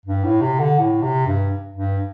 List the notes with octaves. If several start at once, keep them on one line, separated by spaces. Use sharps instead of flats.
G2
A2
C3
D3
A2
C3
G2
G2